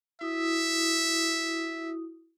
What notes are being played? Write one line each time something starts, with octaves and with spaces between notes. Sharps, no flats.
E4 F#4 E5 D#6